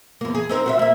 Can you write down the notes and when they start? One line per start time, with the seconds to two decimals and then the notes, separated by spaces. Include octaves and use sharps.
0.21 E2 A#3
0.35 G#4
0.49 C4 D#4 A#4
0.66 F#4 C5 E5
0.79 A#3 E5